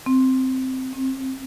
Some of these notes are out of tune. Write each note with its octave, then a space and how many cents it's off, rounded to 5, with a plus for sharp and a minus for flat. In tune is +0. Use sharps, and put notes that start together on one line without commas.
C4 -5
C4 +25